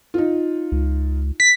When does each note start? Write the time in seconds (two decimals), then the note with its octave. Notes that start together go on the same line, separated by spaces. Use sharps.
0.14 D#4 F4
0.72 C#2
1.40 B6